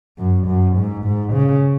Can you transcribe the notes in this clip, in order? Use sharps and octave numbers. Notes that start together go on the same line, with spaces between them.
F#2
F#2
G#2
G#2
C#3